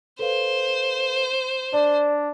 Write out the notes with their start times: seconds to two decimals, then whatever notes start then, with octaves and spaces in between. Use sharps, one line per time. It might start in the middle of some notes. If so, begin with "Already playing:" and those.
0.19 A4 B4 C5 F5
1.73 D4 D5